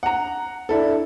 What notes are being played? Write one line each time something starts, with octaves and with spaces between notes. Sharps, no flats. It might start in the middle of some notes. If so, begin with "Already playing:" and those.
F#5 A#5
D4 E4 A4